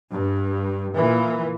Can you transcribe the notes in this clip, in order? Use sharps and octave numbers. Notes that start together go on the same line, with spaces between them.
G2
A#2 E3